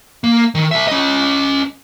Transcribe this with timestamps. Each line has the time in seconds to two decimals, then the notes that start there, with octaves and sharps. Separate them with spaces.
0.24 A#3
0.55 D#3
0.71 C2 E5
0.88 C#4 D#5